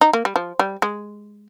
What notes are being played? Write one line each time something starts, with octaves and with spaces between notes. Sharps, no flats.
D#4
A#3
G3
F3
G3
G#3